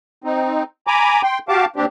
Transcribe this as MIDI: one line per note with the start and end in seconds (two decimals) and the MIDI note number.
0.24 0.63 60
0.24 0.63 63
0.87 1.22 80
0.87 1.22 82
0.87 1.22 83
0.87 1.22 86
1.23 1.39 79
1.23 1.39 84
1.49 1.65 66
1.49 1.65 67
1.49 1.65 77
1.49 1.65 81
1.49 1.65 86
1.76 1.85 39
1.76 1.85 60
1.76 1.85 62
1.76 1.85 67